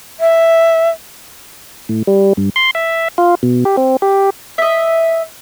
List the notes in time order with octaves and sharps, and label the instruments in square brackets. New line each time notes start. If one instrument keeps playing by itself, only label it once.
[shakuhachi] E5
[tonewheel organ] A2
G3
G2
C6
E5
F4
B2
G4
C4
G4
[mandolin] D#5 E5